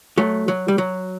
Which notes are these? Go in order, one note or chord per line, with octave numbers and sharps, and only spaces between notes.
F#3 A3
F#3
G3
F#3